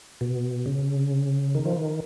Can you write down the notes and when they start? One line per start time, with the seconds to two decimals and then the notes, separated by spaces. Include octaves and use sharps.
0.21 B2
0.66 C#3
1.55 D#3
1.65 F3
1.77 D#3